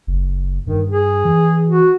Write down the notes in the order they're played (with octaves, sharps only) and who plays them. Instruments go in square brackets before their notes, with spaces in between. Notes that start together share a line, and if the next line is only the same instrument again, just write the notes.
[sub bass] F#1
[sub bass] G2 [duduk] D#3
[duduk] G#4
[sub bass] E3
[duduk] F#4